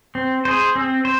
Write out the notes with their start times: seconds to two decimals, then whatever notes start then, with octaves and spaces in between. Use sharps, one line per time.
0.15 C4
0.45 G#4 C5
0.76 C4
1.05 C5